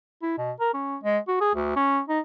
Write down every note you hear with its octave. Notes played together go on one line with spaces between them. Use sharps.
E4
B2
A#4
C#4
G#3
F#4
G#4
D2
C#4
D#4